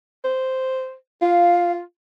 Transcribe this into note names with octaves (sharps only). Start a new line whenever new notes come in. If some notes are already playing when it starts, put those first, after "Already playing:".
C5
F4 F5